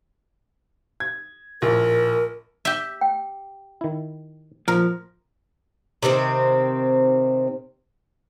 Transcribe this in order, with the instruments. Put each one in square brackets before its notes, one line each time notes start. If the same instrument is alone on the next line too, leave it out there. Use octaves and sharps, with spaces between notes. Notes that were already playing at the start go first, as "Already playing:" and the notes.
[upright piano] G#6
[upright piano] A#1 A2 [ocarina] A#4
[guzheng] G4 E5
[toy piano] G5
[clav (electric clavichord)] D#3 E4
[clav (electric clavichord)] A#2 [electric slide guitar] F3 [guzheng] A#4
[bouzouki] C3 D#3 A#3 C4